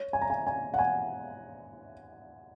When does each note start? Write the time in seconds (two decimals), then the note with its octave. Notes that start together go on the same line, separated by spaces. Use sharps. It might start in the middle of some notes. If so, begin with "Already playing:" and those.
Already playing: C#5
0.13 G#5
0.21 A#5
0.30 G#5
0.47 G#5
0.74 F#5
0.79 G#5